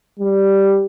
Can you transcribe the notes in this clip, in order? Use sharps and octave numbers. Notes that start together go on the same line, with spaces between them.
G3